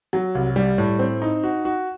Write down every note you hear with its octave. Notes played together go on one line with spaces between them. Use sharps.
F#3
C2
G3
A2
C4
D#4
F#4
F#4